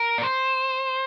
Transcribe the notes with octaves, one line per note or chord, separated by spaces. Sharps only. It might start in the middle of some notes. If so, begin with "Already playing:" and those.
Already playing: A#4
D5
C5